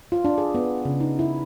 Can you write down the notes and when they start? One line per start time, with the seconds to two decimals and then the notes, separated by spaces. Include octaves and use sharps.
0.12 F4
0.25 D4
0.38 G#4
0.55 B3
0.85 C#3
1.00 D#4
1.19 E4